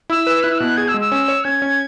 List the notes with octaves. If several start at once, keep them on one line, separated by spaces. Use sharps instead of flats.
E4 E6
B4
E4 F#6
E6
B2 F#6
G#4 G#6
E6
G#3
E6
C#4
C#5
C#4 G#6
C#4